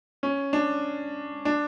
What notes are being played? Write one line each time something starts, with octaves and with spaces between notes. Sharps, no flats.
C#4
D4
D4